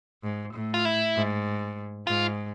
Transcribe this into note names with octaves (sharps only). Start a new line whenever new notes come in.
G#2
A2
F4
E4
G#2
G#2 F4